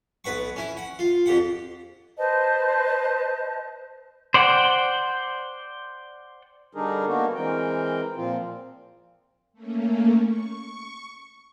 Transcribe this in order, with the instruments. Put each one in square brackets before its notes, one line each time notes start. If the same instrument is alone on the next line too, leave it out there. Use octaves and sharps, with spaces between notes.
[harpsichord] B1 B4 F#5 C#6
C#4 E4
F#5
F4
F2 G4 F#5
[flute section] B4 C5 D#5 A5
[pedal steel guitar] C5 D5 F#5 G5
[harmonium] D3 G3 D4 D#4 G#4 A#4
A#3 B3 D4 D#4 F#4 A#4
E3 G#3 C4 A#4 G5
A#2 F3 C4 F4
[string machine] A3 A#3 C#4
C#6